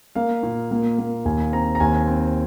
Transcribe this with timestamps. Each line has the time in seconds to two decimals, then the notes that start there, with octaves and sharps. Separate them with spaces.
0.15 A#3 F5
0.43 A#2
0.71 A#3
0.98 A#3
1.25 D#2 G#5
1.52 C4 A#5
1.75 A#5
1.80 D#2 G#5
2.08 C4